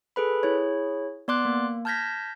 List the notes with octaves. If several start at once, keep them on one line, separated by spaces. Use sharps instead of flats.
G#4 A4 B4 B5
E4 G#4 C#5
B3 D5 C6 D6 F#6
A#3
A5 F6 G6 G#6 A#6 B6